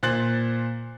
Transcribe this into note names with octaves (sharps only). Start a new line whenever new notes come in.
A#2 C5 F#6 A6 F#7